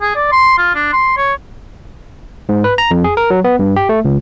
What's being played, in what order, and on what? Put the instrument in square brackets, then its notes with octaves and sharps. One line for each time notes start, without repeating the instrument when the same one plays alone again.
[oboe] G#4
D5
C6
F4
D4
C6
C#5
[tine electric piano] G#2
B4
A#5
F2
G#4
A#4
F#3
B3
G2
G4
A3
C#2